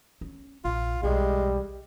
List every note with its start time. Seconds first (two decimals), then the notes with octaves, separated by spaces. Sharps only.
0.21 C#4
0.65 A#1 F4
1.03 B1 E2 G3 G#3